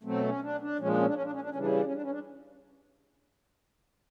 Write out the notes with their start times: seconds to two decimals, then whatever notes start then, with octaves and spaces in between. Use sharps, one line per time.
0.03 B2 F#3 A3 C4
0.23 C#4
0.41 D4
0.60 D4
0.79 A#2 F3 G#3 C#4
0.88 D4
0.97 C#4
1.06 D4
1.14 C#4
1.23 D4
1.32 C#4
1.41 D4
1.50 C#4
1.55 C#3 E3 G3 D4
1.66 C#4
1.76 D4
1.84 C#4
1.93 D4
2.02 C#4
2.10 D4